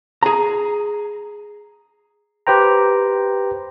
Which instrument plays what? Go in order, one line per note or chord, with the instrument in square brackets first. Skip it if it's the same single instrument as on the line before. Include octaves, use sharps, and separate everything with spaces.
[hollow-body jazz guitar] G#4 A#5
[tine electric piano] G4 B4 C5 G5 A#5